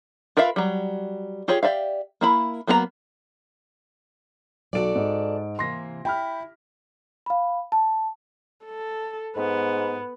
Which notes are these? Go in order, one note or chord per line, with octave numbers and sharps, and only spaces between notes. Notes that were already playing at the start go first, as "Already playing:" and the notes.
F4 A#4 B4 E5 F5
F#3 G3
F4 G4 G#4 C#5
G4 D5 E5 F5
A#3 E4 B5
F#3 A#3 B3 A#4 A#5
B1 F#4 A4 D5 D7
G#2
C3 E3 A#3 C6 A#6
E4 G5 B5 F6
F5 B5
A5
A4
G#2 B3